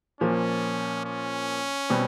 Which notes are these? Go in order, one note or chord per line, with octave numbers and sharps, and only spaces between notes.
A#2 F3 A#3 C#4
C#4
B2 G3 C4